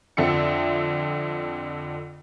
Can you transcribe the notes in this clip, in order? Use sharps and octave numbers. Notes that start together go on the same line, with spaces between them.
F2 D3 C4 E5 C#7